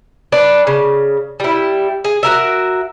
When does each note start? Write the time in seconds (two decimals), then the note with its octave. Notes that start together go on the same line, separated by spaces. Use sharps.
0.32 D4 B4
0.67 C#3
1.40 G3 E4
2.04 G#4
2.23 F#4 A#4 E5